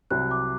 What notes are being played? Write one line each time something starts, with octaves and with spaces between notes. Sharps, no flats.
C2 C3 F#3 F#6
D6